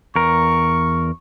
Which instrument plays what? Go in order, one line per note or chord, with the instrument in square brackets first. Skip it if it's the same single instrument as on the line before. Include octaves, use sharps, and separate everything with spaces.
[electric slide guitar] E2 A#4 [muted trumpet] C#6